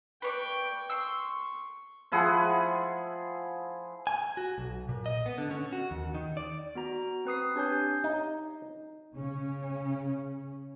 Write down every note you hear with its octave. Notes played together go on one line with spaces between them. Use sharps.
B4 C#5 D5 G5 C#6
C6 C#6 E6
F3 E4 G#4 F#5
G#5
F#4
B1
A#2
D#5
B3
D3
C#4
F#4
D#2
D#3
D5
B3 F#4 A#5
C4 B4 D#6 C7
D4 G4 C#5 G#5 G6
D#4
C#3 C#4